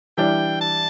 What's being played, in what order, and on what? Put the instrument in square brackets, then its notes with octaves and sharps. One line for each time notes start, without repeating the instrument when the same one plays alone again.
[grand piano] E3 G3 D4 [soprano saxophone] G5
[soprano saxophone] A5